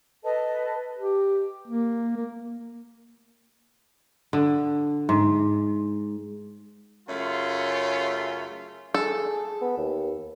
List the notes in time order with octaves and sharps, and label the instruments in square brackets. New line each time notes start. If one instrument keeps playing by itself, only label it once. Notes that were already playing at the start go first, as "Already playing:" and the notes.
[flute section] A4 B4 D#5 A5
[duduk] G4
A#3
A#3
[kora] D3
G#2
[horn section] F#2 C#3 A3 C#4 F4
[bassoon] G#4 [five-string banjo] A4
[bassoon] B3
D#2